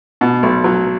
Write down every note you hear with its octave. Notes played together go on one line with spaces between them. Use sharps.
B2
B1
F#3